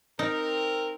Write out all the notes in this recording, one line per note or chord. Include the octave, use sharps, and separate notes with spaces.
C4 D#4 A#4